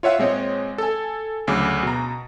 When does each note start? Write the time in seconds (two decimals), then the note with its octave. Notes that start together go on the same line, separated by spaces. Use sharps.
0.03 F4 C#5 E5 F#5
0.18 A#2 G#3 C4 C#5 D#5
0.78 A4 G#5
1.47 D2 C#3 F#3 G#4 D6
1.83 B2 A#5